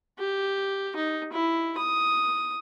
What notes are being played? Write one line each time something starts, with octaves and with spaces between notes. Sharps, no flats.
G4
D#4
E4
D#6